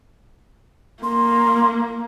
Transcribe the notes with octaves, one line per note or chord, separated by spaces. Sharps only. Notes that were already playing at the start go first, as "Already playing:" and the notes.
A#3 C6